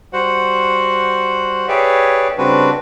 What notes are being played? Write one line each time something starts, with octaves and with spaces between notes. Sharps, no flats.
G3 F#4 C5 F#5
G4 G#4 B4 C#5 D5 E5
C#3 G3 C4 D4 F#4 B4